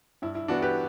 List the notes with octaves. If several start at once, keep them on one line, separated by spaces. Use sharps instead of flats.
G2 E4
E4
E3 B3 D4 F#4
G4 B4